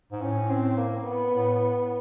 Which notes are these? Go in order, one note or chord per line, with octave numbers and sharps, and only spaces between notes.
G#2
A2 C#4
C4
A#3
B3
A2